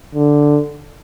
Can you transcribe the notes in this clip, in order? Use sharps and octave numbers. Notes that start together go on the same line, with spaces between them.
D3